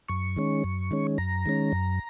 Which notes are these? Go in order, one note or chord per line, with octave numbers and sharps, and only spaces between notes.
F#2 C#6
D#3 G#3 C#4
F#2
D#3 G#3 C#4
F#2 A#5
D#3 G#3 C#4
F#2